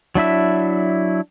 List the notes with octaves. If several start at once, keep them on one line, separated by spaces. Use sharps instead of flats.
F#3 D4 E4 E5